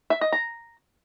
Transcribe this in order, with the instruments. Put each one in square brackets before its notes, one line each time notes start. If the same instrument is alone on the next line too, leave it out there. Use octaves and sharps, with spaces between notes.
[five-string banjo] E5
D#5
A#5